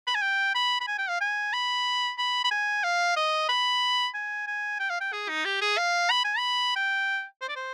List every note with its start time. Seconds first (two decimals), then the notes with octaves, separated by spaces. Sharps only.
0.07 B5
0.15 G#5
0.22 G5
0.55 B5
0.81 B5
0.88 G#5
0.98 G5
1.09 F5
1.21 G#5
1.53 B5
2.18 B5
2.44 B5
2.51 G#5
2.84 F5
3.16 D#5
3.49 B5
4.14 G#5
4.47 G#5
4.80 G5
4.90 F5
5.01 G5
5.13 G#4
5.29 D#4
5.45 G4
5.62 G#4
5.78 F5
6.10 B5
6.25 G#5
6.38 B5
6.76 G5
7.41 C5
7.49 D5
7.56 C5